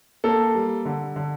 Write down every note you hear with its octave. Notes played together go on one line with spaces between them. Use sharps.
A#3 A4
G3
D3
D3